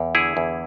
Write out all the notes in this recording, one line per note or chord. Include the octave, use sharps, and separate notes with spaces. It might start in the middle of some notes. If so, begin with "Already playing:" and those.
Already playing: E2
D3 E4 G#4
E2